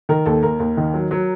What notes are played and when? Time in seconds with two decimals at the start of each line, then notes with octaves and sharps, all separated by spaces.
0.09 D#3 A#4
0.26 D#2 A4
0.43 D#2 A#4
0.60 D#2
0.77 D#3
0.94 F#3
1.11 F#3